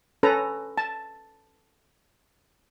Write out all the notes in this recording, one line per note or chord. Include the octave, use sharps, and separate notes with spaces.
C#4 A4 B4 A#5
A5